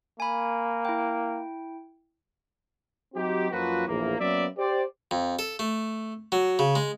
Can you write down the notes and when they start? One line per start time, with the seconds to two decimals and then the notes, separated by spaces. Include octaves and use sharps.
0.20 A#3 G#5 B5
0.85 E4 G5
3.14 F#3 C4 D#4 F#4 G4
3.51 F#2 F3 A#3 F4 F#4 B4
3.87 A#1 E2 A2 E3 A#3
4.19 F#3 A#3 B3 C#4 D5 E5
4.57 G4 C5 D5
5.11 F2
5.39 A4
5.59 A3
6.32 F#3
6.59 C#3
6.75 G#3